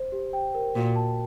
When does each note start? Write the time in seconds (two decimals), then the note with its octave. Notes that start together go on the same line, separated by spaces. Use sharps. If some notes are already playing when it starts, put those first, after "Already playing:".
Already playing: C5
0.12 G4
0.33 G5
0.55 A#4
0.75 A#2 F#4
0.96 A5